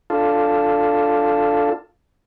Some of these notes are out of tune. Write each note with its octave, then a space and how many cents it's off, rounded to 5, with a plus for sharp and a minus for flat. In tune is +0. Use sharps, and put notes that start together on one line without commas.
D4 +0 F4 +0 A4 +0